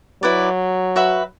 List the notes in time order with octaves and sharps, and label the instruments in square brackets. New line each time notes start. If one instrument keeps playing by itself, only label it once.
[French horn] F#3 [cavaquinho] E4 B4 D5
[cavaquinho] F#4 B4 E5 B5